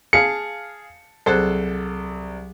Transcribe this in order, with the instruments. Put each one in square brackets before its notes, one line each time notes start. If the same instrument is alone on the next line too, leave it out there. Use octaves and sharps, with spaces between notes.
[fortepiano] G#4 F5 [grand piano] A5 C7 [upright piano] C#7
[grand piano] C2 [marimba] F#3 G#4 F#6 [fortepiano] A4 C5